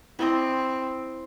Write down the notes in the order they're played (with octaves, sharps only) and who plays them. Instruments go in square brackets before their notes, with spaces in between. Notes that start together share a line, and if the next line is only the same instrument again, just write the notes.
[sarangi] C4 [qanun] E4 D5 D#5